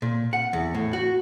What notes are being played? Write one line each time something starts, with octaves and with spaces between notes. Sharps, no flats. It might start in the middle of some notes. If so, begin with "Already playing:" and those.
A#2
F#5
E2
A2
F#4